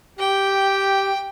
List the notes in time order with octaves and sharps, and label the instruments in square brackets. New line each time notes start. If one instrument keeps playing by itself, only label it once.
[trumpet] G4 [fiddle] G5